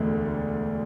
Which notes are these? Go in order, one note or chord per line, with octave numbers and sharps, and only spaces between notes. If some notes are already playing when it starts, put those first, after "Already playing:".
Already playing: E1 D2 D3 A3